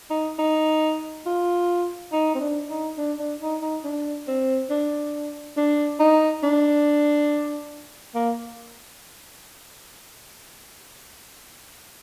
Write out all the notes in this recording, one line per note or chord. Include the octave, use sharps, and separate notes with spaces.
D#4
D#4
F4
D#4
C4
D4
D#4
D4
D4
D#4
D#4
D4
C4
D4
D4
D#4
D4
A#3